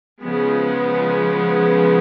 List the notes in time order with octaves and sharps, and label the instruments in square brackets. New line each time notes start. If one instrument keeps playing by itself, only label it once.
[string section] C#3 F3 G#3 B3